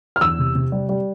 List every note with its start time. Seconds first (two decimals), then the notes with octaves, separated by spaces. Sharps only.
0.16 F6
0.21 E2 E6
0.39 C3
0.55 C3
0.72 G3
0.89 G3